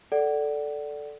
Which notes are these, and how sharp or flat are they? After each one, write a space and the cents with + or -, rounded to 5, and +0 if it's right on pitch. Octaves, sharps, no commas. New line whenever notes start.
A4 +0 D5 -10 F#5 +25